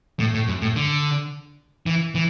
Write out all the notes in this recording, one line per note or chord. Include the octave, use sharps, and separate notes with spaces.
A2
A2
F#2
A2
D3
E3
E3